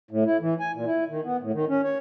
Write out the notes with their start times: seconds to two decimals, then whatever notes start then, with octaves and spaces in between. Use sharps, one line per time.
0.11 A2
0.26 E4
0.41 E3
0.60 G#5
0.74 A#2
0.87 E4
1.10 D#3
1.24 B3
1.41 A2
1.54 D#3
1.69 C#4
1.83 C#5